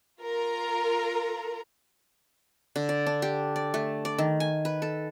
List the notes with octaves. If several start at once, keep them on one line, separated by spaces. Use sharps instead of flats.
F4 A#4 A#5
D3
D5
D4
G4
D5
A3
D5
D#3
G#5
B4
A4